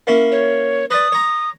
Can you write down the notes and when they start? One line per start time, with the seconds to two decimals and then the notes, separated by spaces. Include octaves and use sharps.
0.07 A#3 C#4 E4
0.32 C#5
0.91 B4 D5 D#6
1.12 C#5 A#5